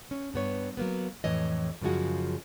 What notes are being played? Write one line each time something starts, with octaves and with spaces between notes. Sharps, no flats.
C#4
G2 B3 C#5
F#3 A#3 B3
F2 A2 E3 C#5 D#5
F#2 C#3 F3 G#3 F#4